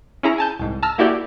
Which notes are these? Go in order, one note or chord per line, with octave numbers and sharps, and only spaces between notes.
C#4 E4 G#4 A#5
G#5 A5 G6
C2 G#2
A5 A#5 E6 F6
A#3 E4 F#4 G4 D5 G5